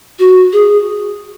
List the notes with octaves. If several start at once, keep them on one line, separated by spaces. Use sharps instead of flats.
F#4
G#4